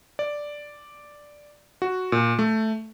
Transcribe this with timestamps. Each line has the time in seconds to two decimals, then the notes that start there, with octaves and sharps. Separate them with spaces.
0.19 D5
1.82 F#4
2.12 A#2
2.39 A3